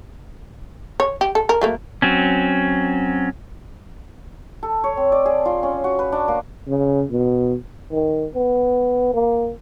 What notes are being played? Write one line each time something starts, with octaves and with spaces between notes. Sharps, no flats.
C#5
G4
A4
A#4
F#3 A3 A#3
F#3 C4 C#4
A4
C#5
C4
D5
G#4
F4
C#4
F#4
B4
D4
A#3
C#3
B2
D#3
B3
A#3